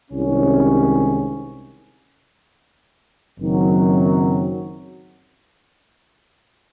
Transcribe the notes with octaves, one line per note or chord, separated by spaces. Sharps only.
C2 C3 D#3 G#3 C#4
F#1 F#2 D#3 F#3 C4